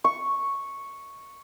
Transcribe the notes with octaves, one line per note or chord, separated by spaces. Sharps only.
C#6